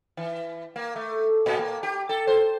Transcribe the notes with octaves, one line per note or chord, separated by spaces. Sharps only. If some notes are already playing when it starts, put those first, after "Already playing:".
E3
A#3
A3
A#2
A#3
G4
A4
C5